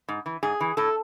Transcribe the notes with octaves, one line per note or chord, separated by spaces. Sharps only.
G#2
E3
G#2 G#4
E3
A2 A4